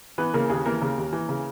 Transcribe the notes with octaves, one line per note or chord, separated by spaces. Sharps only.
E3 B3 B4
C#3 A#3 A#4
D#2 G#4
E3 A#3 A#4
C#3
D#2
E3
C#3